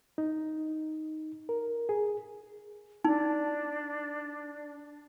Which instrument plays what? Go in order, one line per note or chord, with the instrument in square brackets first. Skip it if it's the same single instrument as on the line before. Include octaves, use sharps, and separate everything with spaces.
[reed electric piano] D#4
A#4
G#4
[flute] D4 [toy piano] D#4